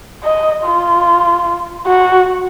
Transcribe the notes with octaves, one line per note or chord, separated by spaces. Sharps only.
D#5
F4
F#4